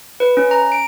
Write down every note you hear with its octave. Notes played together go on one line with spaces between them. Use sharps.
B4
C#4
A#5
D7